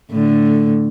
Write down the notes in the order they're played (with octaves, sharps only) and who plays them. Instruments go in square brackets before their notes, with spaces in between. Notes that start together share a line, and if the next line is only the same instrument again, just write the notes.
[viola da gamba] A2 D3